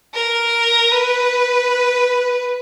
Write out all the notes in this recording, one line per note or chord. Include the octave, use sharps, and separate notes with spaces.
A#4
B4